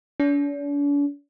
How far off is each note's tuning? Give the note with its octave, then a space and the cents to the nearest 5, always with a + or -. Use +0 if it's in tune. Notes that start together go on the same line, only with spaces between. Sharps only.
D4 -45